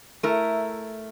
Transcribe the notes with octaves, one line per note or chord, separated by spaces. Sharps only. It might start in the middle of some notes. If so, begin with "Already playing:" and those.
A3 E4 A#4